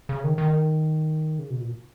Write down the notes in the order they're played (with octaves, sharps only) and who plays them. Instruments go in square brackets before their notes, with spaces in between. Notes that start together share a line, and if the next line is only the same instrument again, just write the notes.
[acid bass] C#3
D#3
D#3
C#3
B2
A#2